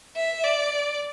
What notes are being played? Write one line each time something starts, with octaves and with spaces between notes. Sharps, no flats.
E5
D5